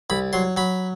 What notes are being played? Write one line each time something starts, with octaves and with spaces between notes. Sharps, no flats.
C2 B5
F#3 C6
F#3 B5